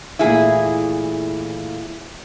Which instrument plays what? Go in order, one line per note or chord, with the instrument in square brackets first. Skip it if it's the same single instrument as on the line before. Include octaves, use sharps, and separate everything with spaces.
[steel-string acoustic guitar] A#2 E3 A3 [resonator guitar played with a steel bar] E4 G#4